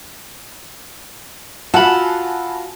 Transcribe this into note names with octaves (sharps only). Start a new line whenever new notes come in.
F4 F#4 F5 F#5 G#5 A5 B5 E6